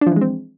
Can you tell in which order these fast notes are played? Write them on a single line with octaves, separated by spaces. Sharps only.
D4 F3 E3 G#3 C4